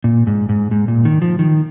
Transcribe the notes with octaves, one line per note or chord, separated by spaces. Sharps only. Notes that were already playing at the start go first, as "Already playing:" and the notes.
A#2
G#2
G#2
G#2
A#2
D#3
F3
D#3